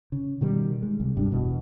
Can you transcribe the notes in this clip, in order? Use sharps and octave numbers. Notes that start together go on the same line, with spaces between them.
C#3
B2 D#3 G3
G#3
C2
F1 G2 G3 D4
E1 B2 E3